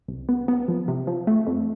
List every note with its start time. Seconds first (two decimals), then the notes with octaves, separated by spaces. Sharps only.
0.08 C2
0.29 B3
0.48 B3
0.68 F3
0.88 C3
1.07 F3
1.27 A3
1.47 F2